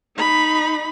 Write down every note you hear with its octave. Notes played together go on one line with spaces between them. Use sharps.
D#4 B5